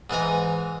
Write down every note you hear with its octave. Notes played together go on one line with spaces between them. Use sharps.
G#2 E3 G#5 A#5